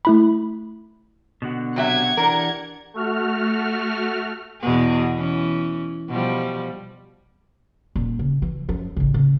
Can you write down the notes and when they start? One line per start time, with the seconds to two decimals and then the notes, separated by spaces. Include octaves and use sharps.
0.05 A3 E4 B5
1.42 B2 D3 F#4
1.76 C3 F#3 E5 F#5 G#6
2.17 E3 D4 G4 A#4
2.94 A3 F#4 F6
4.61 E2 B2 G#4
5.16 E3 C#4
6.09 B2 F3 G3
7.95 D#1
8.19 C#3
8.42 E3
8.69 F#2 F3
8.96 A1 C#3
9.14 C#3